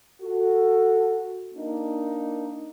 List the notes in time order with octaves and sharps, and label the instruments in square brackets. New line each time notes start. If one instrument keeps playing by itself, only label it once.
[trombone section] F#4 A4
A#3 D4 D#4